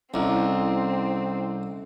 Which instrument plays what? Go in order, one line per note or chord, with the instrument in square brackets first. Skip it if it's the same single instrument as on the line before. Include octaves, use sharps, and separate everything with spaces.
[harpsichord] C2 [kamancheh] C4 [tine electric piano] C#4 A4 [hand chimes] E4 D#5 A#5